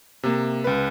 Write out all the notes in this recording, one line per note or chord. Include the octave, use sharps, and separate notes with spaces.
C3 A#3
C#2 B4